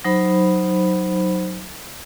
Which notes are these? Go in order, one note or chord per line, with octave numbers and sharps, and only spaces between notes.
F#3 D#4 C5 B5